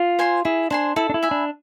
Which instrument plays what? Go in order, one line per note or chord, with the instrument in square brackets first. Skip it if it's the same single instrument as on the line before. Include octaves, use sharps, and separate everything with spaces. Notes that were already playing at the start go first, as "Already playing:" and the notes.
Already playing: [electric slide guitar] F4
[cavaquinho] C5 G#5 C6
[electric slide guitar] E4 [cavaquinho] G#4
[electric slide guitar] D4 [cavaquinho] C5 G#5 C6
[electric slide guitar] E4 [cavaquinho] A4
[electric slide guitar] D4
E4
[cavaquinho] E5 G#5 B5
[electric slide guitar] D4